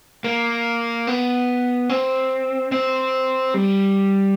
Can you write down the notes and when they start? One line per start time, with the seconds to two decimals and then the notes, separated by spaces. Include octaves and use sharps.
0.24 A#3
1.07 B3
1.90 C4
2.72 C4
3.54 G3